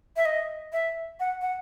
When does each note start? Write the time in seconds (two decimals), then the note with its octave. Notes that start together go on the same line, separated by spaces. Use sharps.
0.16 E5
0.25 D#5
0.73 E5
1.20 F#5
1.41 F#5